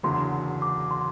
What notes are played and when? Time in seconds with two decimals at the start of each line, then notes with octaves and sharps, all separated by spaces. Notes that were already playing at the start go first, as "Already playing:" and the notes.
0.03 F#1 E2 D3 F#3 C6
0.62 D6
0.91 C6